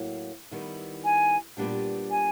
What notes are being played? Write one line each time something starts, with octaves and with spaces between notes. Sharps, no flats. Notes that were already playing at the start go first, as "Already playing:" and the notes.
Already playing: A2 F#3 A#3
D#3 G3 B3 E4
G#5
A#2 G3 B3 D4 G4
G#5